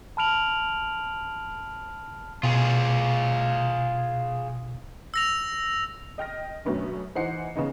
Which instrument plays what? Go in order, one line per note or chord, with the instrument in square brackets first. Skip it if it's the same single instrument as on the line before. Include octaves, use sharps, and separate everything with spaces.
[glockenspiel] A5 B5 F6 D7 F7 F#7
[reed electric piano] B2 [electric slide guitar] F4 G#4
[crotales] E6 A#6 F7
[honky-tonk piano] D#5 G5 F6 A#6
F#2 B2 A3 B3 C#4 D4
E3 D#4 C5 F#5 C7 C#7
C#3 B3 C#4 D#4